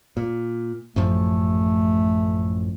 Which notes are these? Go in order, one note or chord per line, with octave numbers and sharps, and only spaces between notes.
A#2
A1 F#2 F3 A3